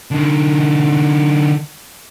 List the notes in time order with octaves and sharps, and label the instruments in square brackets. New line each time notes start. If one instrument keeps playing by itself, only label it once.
[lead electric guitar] D3 D#4